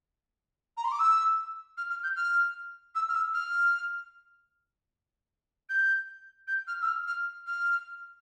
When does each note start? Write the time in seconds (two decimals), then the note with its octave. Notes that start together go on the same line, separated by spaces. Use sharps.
0.77 A#5
0.84 C6
0.91 D6
0.99 E6
1.77 F6
1.90 F6
2.03 G6
2.16 F6
2.95 E6
3.08 F6
3.14 E6
3.33 F6
5.69 G6
6.47 G6
6.67 F6
6.81 E6
6.86 F6
7.07 F6
7.46 F6